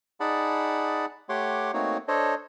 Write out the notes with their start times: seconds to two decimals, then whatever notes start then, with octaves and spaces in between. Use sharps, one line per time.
0.20 D#4 G#4 D5 F#5 A5 B5
1.29 A3 G4 C#5 F#5 C6 D6
1.74 A3 A#3 C4 D#4 F#4 C#5
2.08 D4 A4 C5 C#5 D#5